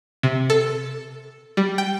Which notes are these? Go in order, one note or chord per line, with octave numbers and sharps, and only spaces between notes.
C3
A4
G3
G5